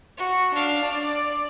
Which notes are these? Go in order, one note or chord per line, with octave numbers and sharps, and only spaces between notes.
F#4
D4 F5
D5